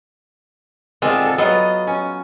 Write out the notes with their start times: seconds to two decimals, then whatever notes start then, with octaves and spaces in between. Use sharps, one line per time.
1.02 D3 D#3 G#3 C4 F4 D#5
1.25 A4
1.38 F#3 B3 F4 D#5
1.87 C#4